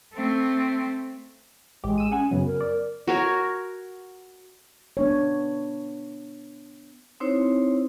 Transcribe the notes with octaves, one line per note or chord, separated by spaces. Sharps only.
A3 C4
A1 G#3 G4
E6 D#7
C#4 G#4 F#5 G#5
F#2 C#3 F#3 B3
A#4
D5
F#4 A#4 C#5
B3 D4 C#5
C4 D#4 E4 C5 C#5